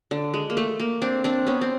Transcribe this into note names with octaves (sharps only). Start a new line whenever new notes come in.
D3
G#3
A#3
A3
A#3
C4 D4
C4 D4
B3 C#4
C4